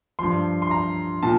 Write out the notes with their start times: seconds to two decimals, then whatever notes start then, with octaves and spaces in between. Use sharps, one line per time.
0.19 G2 F3 C6
0.62 C6
0.71 A#5
1.23 A#2 A5